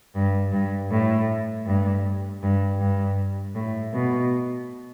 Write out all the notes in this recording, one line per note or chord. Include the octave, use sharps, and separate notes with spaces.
G2
G2
A2
G2
G2
G2
A2
B2